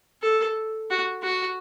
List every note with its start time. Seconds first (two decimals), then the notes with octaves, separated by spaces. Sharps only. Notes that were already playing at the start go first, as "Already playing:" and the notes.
0.22 A4
0.90 F#4
1.23 F#4